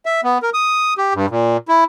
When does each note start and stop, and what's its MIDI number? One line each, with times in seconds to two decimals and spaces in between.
0.06 0.21 76
0.24 0.38 59
0.43 0.50 70
0.54 0.94 87
0.98 1.14 67
1.14 1.26 43
1.30 1.57 46
1.68 1.84 64